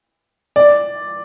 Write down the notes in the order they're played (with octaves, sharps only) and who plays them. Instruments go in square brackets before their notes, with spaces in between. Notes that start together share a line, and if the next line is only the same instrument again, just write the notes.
[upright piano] D5